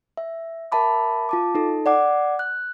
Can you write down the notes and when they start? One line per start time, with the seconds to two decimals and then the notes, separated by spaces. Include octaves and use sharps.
0.17 E5
0.72 A#4 E5 A5 B5 D6
1.29 F4 A5 D6
1.55 D#4 A4
1.86 D5 F#5 D6
2.39 F#6